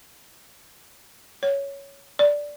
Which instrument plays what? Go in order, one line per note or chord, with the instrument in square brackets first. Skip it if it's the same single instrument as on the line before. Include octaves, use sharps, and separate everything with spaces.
[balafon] C#5
D5